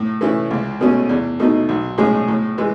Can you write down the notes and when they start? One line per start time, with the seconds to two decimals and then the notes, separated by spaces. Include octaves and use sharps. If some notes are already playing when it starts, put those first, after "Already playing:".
Already playing: A2
0.21 E3 A3 C#4 E4
0.51 C#2
0.81 B2 A3 C#4
1.09 E2
1.39 B2 A3 D#4
1.69 B1
1.98 A2 G#3 C#4 G#4
2.28 A2
2.58 E3 G#3